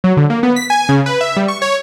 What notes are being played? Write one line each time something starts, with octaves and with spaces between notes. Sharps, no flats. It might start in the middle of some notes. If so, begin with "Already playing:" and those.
F#3
D3
A#3
B3
B6
G#5
C#3
B4
E5
G3
C#6
C#5